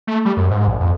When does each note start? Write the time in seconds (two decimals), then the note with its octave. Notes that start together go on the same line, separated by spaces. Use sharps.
0.07 A3
0.25 G3
0.37 F#2
0.51 G#2
0.68 A#1
0.80 F2